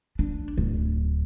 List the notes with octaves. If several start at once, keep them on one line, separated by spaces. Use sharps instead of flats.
D4
D1